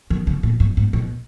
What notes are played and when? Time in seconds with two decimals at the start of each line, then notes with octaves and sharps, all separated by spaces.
0.10 D#3
0.27 C#3
0.43 A#2
0.60 G2
0.77 G#2
0.93 B2